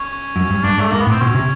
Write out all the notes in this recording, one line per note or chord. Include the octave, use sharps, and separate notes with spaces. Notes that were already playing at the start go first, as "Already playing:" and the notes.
Already playing: C#4
F#2
G2
G2 D4
G#2 A3
G#2 A#3
B3
A2
C4
B2 C#4
C3